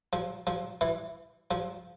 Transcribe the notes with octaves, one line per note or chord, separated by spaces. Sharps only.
F3
F3
E3
F3